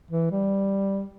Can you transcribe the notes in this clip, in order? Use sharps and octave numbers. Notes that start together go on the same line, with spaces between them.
E3
G3